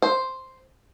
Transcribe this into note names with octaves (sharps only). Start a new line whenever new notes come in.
C5